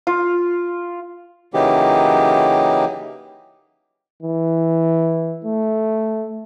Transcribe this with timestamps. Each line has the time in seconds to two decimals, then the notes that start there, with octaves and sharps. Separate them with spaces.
0.07 F4
1.54 C#3 E3 F#3 A#3 D#4 G4
4.23 E3
5.44 A3